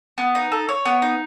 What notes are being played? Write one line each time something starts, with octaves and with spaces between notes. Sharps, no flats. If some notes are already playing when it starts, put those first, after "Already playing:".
B3
D#4
A4
C#5
B3
D#4